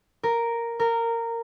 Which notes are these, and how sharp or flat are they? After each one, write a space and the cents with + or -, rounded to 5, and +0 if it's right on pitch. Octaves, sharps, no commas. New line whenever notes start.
A#4 +0
A#4 -15